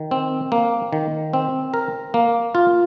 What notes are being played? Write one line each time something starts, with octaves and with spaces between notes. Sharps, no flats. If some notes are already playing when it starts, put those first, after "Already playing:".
Already playing: D#3
C4
A#3
D#3
C4
A#4
A#3
F4